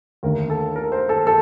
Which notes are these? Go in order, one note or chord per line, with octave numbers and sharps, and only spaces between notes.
D#2 D3 A3 A#4
A4
A#4
C5
A4
A4